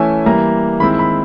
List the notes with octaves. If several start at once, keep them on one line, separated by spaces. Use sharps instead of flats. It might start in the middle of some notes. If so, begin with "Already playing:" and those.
Already playing: E3 A3 C#4 E4 G#5
E3 G3 A#3 A#5
D#3 G#3 C4 E4 B5
B5